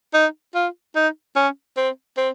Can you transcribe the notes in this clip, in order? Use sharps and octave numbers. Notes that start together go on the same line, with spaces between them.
D#4
F4
D#4
C#4
C4
C4